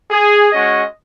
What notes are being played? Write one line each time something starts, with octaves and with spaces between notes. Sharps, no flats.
G#4
G#3 C#4 F#4 D#5